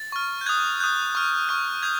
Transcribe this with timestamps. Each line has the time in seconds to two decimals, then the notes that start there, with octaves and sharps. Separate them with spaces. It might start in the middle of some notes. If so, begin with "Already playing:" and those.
Already playing: A6
0.12 C#6 F6
0.41 G6
0.46 D#6 F#6 G#6
0.80 D#6 F#6 G6
1.15 C#6 F6
1.49 C#6 F6
1.83 D#6 G6 G#6